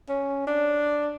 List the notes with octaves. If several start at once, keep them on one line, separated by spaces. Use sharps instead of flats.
C#4
D4